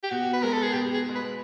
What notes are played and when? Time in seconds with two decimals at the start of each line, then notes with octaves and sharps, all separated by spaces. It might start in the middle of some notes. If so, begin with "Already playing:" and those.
0.03 G4
0.10 B2 F#4
0.33 B4
0.41 G#3 B3 A#4
0.52 A4
0.62 G#4
0.73 B2 G4
0.94 G#4
1.04 B3
1.09 G#3
1.15 B4